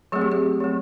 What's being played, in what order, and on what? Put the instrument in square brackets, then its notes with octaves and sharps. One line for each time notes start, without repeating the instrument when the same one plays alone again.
[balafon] F#3 A3 C4 G#4
G4
G#4
F#3 A3 C4